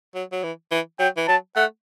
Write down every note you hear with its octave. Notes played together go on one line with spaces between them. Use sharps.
F#3
F#3
E3
E3
F#3 G5
E3
F#3 A5
A3 F#5